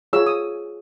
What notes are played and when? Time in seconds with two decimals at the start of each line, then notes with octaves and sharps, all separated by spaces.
0.13 F4 G#4 C#5 E6
0.27 D#6